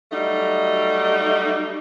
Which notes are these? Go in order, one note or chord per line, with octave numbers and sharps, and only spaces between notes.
F#3 G3 A3 D#4